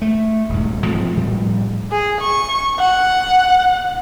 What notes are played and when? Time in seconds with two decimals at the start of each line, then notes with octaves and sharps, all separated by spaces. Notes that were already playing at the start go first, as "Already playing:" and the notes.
0.02 A3
0.49 D#1 G#2
0.86 G#2 F3 F#3 C4
1.17 A2 F3 G3
1.91 G#4
2.21 C#6
2.79 F#5